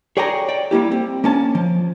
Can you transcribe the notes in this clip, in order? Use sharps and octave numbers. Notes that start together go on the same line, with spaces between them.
G#4 C#5 D5 G5 G#5 A#5
D5 G5
G3 A#3 E4 G4
C4
A#3 C#4 A5
F3